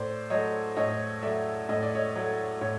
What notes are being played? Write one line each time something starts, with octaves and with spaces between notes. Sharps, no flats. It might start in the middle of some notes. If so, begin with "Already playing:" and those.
Already playing: A2 C5 D5
F#3 A3 C#5 D#5
A2 C#5 D#5
F#3 A3 D5 E5
A2 D#5
D5
C#5 D#5
F#3 A3
A2 C#5